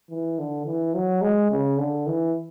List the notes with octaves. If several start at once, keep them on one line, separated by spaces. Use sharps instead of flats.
E3
D3
E3
F#3
G#3
C#3
D3
E3